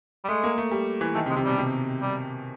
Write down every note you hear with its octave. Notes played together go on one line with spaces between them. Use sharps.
G3
G#3 A3
A#3
A3
G3
E3
D#3 A3
C3
G#3
C3
B2 G3
C3
G3